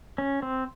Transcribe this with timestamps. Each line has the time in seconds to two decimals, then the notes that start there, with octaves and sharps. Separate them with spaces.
0.18 C#4
0.42 C4